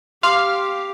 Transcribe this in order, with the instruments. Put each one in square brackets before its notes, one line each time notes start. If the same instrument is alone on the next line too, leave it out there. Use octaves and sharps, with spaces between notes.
[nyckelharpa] G4 [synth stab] F5 [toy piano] C6 D6